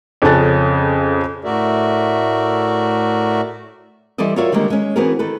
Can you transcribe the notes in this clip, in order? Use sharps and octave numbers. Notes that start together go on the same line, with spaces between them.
F2 C#3 C#4 A4 F#6 A6
A2 A3 F#4 A#4 D5 E5
E3 G3 A4 C5 D5 D#5
F4 F#4 A#4 C#5 D5 E5
D3 D#3 G3 G#3 A#3 D4
G#3 C#4
E3 B3 C4 F#4 G#4 A#4
D#3 A4 B4